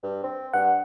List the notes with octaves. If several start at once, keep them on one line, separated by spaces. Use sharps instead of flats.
G2
C4
G2 F#5